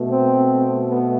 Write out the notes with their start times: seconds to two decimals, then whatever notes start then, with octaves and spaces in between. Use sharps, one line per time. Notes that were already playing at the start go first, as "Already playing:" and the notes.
Already playing: B2 A3
0.09 C4
0.89 B3